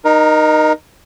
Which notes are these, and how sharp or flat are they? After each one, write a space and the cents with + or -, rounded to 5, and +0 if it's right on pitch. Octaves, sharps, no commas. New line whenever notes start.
D#4 -15 A#4 +20